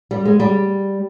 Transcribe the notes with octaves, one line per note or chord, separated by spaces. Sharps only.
G3
G#3
G3